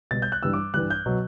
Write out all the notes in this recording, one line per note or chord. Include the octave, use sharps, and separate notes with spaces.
B2 G3 A6
G6
F#6
G2 E3 G3 E6
D6
G2 E3 G3 F#6
G6
B2 F#3